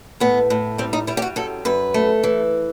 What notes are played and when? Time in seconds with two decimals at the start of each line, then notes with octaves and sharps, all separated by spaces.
0.20 A2 B3
0.50 A2
0.78 G3 C4
0.93 D#4
1.07 G3 E4
1.17 G4
1.22 F#4
1.36 F#2 A4
1.65 F#2 B4
1.94 A3
2.23 E3